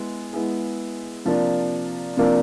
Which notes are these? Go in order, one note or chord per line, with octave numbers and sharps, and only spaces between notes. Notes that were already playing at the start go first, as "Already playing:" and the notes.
Already playing: G#3 B3 E4
G#3 B3 E4 G#4
C3 F3 A#3 D4
C3 F3 A#3 D4